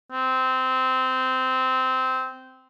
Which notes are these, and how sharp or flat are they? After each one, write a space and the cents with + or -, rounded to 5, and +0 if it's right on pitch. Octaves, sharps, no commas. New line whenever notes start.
C4 -15